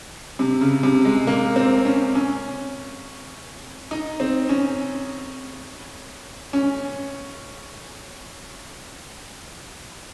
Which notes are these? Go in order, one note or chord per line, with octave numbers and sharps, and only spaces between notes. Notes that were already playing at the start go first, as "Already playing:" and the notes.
C3
C#3
C3
G#3
A#3
C4
C#4
C#4
D#4
C4
C#4
C#4